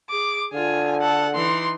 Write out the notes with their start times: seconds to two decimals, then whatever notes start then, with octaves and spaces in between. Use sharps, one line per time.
0.10 G#4 D6
0.54 D3 F4 G#5
1.01 A4 F#5
1.35 E3 D#4 C6